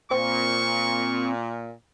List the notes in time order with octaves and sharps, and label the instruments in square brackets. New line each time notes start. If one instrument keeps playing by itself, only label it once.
[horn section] A#2 [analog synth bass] C4 [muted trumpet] C#6